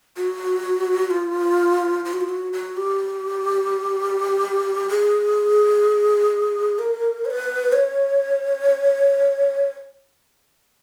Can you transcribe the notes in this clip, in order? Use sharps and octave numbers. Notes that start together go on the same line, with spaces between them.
F#4
F4
F4
F#4
F4
F#4
F#4
G4
G#4
A#4
C#5
B4
C#5